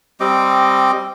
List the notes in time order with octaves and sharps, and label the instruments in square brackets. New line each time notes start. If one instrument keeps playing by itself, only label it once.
[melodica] G3 C4 D#5 D6